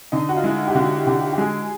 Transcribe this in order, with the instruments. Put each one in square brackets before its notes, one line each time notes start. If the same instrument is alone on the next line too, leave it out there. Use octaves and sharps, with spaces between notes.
[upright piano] D3 [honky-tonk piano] D#4
[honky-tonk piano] F#4
F4
[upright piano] G#3 [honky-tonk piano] E4
[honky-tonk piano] G4
[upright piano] D3 [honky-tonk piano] F#4
[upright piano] D3 [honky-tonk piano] G4
[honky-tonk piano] G4
[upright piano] G#3 [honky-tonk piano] G#4